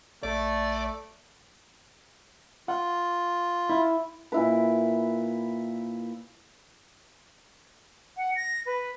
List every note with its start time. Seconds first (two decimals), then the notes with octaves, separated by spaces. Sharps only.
0.23 A#1 A3 D5
2.68 F4 F#5
3.70 E4
4.32 A#2 E4 B4
8.17 F#5
8.36 A#6
8.66 B4